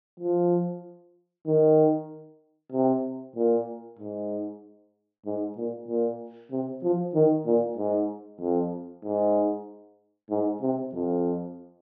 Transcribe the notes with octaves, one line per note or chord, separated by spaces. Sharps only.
F3
D#3
C3
A#2
G#2
G#2
A#2
A#2
C3
F3
D#3
A#2
G#2
F2
G#2
G#2
C3
F2